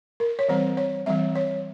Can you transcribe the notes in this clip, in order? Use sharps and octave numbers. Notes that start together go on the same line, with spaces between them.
A#4
C#5
E3 G3 C4 C5
C#5
E3 G3 C4 E5
C#5